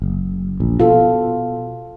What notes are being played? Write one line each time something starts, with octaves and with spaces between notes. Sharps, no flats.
F#1
A#1
B2 F4 A4